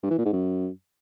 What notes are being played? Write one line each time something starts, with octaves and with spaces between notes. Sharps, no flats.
G2
E3
A#2
G#2
F#2